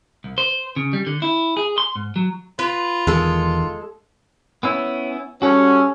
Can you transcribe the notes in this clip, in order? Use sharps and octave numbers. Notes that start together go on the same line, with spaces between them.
C2
C5
C#3
G3
D3
E4
G#4
C6
G#2
F#3
F4 B4
E1 E2 D#3 G#3 A4
B3 C#4 E4
G3 C#4 F#4 A4 F#5